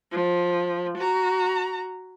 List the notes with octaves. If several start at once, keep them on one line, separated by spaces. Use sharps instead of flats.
F3
F#4 A#5